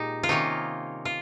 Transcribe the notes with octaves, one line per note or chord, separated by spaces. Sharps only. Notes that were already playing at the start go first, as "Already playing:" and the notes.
Already playing: A#2 G#3 D#4 G4
F4
C3 D#3 A#3 C#4 D#4
F4